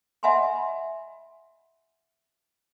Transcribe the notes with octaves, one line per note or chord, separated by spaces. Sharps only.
D#5 E5 F#5 G#5 B5 C6